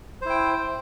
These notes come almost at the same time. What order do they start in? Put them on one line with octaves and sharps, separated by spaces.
C5 E4 G5